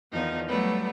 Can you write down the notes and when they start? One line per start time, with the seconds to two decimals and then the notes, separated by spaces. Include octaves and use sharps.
0.12 E2 D#3 F3 D#4
0.48 F#3 G3 A3 B3 B4